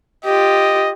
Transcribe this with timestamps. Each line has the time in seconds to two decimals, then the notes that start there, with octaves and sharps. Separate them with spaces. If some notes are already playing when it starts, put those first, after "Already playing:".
0.24 F4 G4 D#5